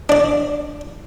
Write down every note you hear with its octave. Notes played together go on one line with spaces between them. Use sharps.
D4 D5